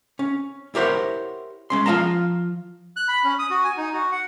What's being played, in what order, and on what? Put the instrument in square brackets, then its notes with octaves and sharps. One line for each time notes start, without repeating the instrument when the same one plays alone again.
[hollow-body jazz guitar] C#4
E4 G4 A#4 C5 C#5 F#5
G#3 C#4 C6
F3 F4 G#4 F5 A5 A#5
[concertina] F#6
B5
C#4
D#6
F#4
G#5
D#4
F#4
F#5